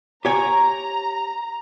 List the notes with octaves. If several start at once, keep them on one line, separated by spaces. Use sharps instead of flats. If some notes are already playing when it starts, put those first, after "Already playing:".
G4 C#5 G#5 A#5